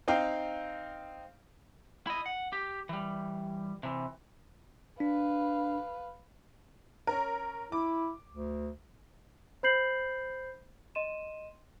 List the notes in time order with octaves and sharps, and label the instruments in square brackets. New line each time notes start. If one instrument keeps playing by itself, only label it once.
[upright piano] C4 D#4 F5 G5
[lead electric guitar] E4 D#5
F#5
G4
E3 G3
C3 E3
[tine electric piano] D4 [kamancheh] B4 F5
[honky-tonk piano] C#4 A#4
[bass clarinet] E4 [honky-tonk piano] D6
[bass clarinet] D2
[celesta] C5 B5 G6 C7 F#7
D#5 C6 D#7 E7